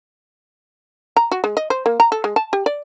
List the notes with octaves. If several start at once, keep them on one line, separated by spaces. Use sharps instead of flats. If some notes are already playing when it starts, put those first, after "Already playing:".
A#5
F#4
G#3
D#5
C5
A#3
A#5
A4
G#3
A5
G4
D5